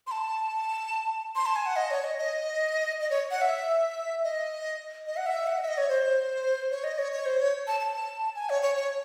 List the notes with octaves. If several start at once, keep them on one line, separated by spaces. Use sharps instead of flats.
C6
A5
C6
A5
G#5
F#5
D#5
C#5
D#5
D#5
D#5
C#5
F#5
E5
D#5
D#5
F#5
E5
F#5
D#5
E5
D#5
C#5
C5
C#5
D#5
C#5
C#5
C5
C#5
A5
A5
G#5
C#5
C#5
C#5